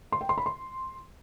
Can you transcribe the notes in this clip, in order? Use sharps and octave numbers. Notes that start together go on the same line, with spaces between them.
C6
G5
C6
B5
C6